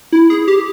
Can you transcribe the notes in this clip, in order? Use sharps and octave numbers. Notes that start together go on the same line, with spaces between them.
E4
G#4
G4